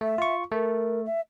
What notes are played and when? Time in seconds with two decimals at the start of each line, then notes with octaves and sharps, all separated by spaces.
0.01 A3 E5
0.18 F4 C#6
0.52 A3 A#4
1.05 E5